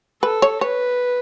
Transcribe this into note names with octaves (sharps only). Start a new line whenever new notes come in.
A4 B4
C#5
B4 C#5